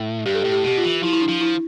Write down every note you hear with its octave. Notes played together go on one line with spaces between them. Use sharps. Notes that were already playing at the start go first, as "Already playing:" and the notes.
Already playing: A2
G2 G4
A4
A2 G4
G4
B2 G4
F4
E3
F3 E4
E4
D4
F3
E4